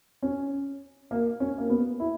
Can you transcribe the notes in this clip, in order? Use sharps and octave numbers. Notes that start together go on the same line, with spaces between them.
C#4
A#3
C#4
A#3
B3
E4